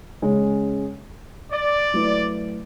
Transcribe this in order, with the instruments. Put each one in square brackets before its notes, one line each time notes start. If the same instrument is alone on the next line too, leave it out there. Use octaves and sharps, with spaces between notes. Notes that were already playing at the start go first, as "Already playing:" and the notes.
[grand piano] C#3 G#3 C#4
[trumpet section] D5
[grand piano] F#3 A3 E4 B4